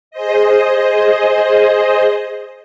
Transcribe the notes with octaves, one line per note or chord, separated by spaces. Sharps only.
G#4 C5 D#5